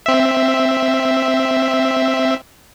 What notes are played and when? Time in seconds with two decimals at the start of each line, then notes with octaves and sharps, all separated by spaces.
0.06 C4 E5